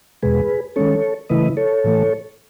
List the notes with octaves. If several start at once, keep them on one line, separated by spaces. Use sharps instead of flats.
E2 B2 G#3 G#4 B4
D#3 G#3 C#4 A4 C#5
C#3 E3 A3 E4 B4 D#5
A4 C#5
A2 E3 A3